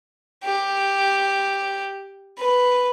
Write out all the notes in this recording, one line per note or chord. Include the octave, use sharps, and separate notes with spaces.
G4
B4